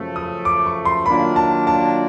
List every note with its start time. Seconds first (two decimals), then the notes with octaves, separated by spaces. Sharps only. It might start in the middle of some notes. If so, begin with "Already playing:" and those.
Already playing: F#2 C#3 F3 A3
0.16 D#6
0.45 D6
0.66 C#6
0.85 C6
1.06 D#3 F#3 A#3 D4 F4 B5
1.36 A5
1.67 A5